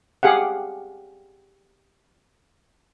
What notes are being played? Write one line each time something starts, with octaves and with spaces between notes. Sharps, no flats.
G4 G#4 F5 F#5